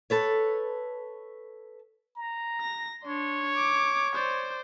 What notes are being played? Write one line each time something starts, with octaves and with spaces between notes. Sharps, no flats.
A4 B4 C#5
A#5
A#6
D4 C#5 C6
D6
C5 D5